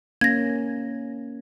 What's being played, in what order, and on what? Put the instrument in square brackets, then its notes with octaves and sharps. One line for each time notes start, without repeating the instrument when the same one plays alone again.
[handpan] A#3 C#4 [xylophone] G#6 A#6